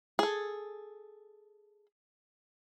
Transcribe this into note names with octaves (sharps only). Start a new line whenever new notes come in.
G#4 A4